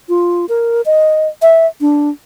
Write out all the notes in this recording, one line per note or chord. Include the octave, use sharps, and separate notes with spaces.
F4
A#4
D#5
E5
D4